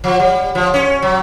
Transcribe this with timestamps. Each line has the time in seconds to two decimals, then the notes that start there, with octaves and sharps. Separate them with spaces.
0.04 F3
0.20 G3
0.55 F3
0.74 C#4
1.02 F#3